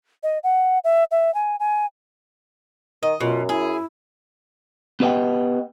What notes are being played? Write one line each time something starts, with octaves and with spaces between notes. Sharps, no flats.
D#5
F#5
E5
E5
G#5
G#5
D#3 D#5
F#2 B2 F4
E4 G#4
B3 G4 B4 D#5 F#5 G5